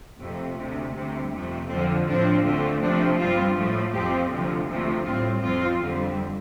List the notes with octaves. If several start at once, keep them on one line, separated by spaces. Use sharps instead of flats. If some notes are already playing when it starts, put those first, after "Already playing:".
F2 C3 A3
D2 C3 A3
D2 C3 G3
F2 C3 A3
F2 D3 F3 C4
A2 F3 C4 D4
D2 D3 A3 C4 F4
C3 F3 A3 C4 D4
G2 G3 C4 F4
A2 F3 A3
F2 F3 C4 G4
D2 C3 F3
D2 C3 F3 A3
A2 G3 C4 F4
F2 F3 C4 F4
F2 D3 G3 C4